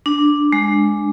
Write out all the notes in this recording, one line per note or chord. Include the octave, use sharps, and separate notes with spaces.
D4
G#3